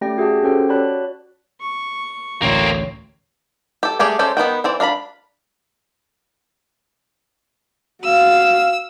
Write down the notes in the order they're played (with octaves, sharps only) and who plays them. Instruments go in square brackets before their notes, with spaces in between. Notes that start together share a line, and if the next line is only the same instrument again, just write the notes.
[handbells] A3 C#4 G4 D5 G5 A#6
F#4 G#4 E5 G5 A5
C#4 F#4 G4 A4 C5 G5
F#4 C#5 D5 A5 B5 F#6
[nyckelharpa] C#6
[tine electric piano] A1 D2 C#5 [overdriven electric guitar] A#3 C4
[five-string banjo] G4 A4
G3 A3 G4 G#4 D5
C#4 G4 A4 C5 D5
D#3 B3 F#4 G5
E3 C4 D5
D4 F5 A#5 B5
[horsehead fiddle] F#4 F5 [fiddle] E6